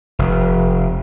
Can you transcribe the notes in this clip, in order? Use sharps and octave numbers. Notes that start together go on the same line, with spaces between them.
F1